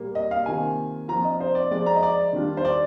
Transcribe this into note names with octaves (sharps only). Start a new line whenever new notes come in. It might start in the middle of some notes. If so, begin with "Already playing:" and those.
Already playing: A#2 G3 A#3
D#5
F5
C3 D#3 A#3 F4 G#5
F3 C4 F4 A#5
D#5
C5
D5
F3 G#3 D#4 D5
A#5
D#5
D5
D#3 G3 D4 F4
C5
D5